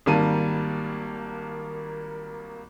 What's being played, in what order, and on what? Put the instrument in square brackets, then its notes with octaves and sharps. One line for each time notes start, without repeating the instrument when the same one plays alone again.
[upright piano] G#1 D#3 G3 A#3 A5 D#7